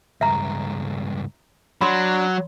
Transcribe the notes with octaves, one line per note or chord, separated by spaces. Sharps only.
C#2 G2 E5 A#5
F#3 D4 B5 C6